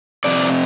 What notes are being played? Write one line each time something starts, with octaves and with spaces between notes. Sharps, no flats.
F2 C3 D5